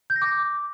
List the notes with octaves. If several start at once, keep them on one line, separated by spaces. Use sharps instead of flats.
G6
A#6
D6